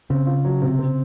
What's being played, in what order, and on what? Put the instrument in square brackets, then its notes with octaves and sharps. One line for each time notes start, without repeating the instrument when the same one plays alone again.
[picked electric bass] C#3 [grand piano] C4
[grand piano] F4
F#3
C3
C4